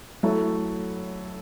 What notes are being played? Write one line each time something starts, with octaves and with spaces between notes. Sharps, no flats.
F#3 A3 E4